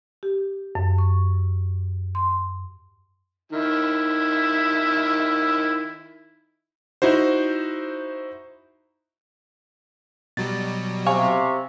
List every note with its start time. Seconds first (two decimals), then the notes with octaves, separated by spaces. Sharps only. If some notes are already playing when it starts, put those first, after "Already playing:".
0.23 G4
0.75 F#2
0.98 C#6
2.15 C6
3.52 D#3 E4
7.02 D#4 E4 F#4 C5
10.37 B2 F#3 G3 A6
11.06 C3 F5 G#5 C#6